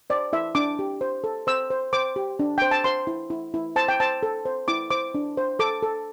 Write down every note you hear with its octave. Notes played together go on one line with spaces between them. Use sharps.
C5 D5
E4 E5
D4 D6
G4
C5
A4
C5 E6
C5
C5 D6
G4
D4
C5 G5
A5
C5 C6
E4
E4
E4
C5 A5
G5
C5 A5
A4
C5
E4 D6
C5 D6
D4
C5
A4 D6
A4